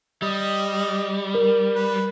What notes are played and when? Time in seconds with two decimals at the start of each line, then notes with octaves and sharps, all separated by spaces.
0.22 G3 D#5
1.35 A#4
1.75 B4